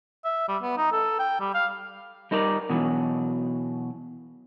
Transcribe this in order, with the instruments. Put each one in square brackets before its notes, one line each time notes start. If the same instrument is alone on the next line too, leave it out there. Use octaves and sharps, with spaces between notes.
[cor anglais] E5
G3
B3
D#4
A4
G5
G3
F5
[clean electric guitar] G3 D#4 A#4 C5 D5
B2 E3 F#3